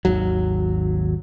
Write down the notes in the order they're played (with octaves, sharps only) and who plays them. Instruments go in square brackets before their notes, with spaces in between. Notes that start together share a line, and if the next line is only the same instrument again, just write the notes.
[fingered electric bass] G#1 D#2 F#3